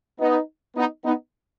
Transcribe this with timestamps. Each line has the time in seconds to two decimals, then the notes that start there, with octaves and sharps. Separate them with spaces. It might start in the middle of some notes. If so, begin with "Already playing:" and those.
0.20 B3 D#4
0.76 B3 D#4
1.04 B3 D#4